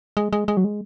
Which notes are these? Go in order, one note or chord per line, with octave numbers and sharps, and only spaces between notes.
G#3
G#3
G#3
F#3
G#3